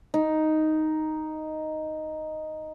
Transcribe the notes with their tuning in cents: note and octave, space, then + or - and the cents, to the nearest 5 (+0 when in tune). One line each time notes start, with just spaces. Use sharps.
D#4 +0